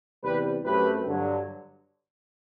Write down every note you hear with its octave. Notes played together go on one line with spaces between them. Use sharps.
E2 C3 G3 G4 B4
F#2 F#3 A3 C4 G4 B4
G2 D3 F#3